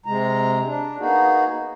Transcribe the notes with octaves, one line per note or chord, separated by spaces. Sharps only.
C3 G#3 A#5
D4
A#3 B3 D#4 F#4 G#4